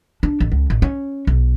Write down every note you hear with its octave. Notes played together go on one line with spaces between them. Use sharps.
D4
A1
C#2
A1
C#4
B1